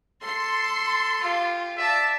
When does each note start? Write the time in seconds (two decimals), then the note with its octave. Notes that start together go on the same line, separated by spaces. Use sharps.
0.24 A4 C6
1.21 F4 G4
1.78 D5 E5 A5